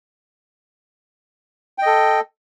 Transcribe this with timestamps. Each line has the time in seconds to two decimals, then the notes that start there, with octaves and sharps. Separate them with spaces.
1.78 G5
1.82 D#5
1.86 A4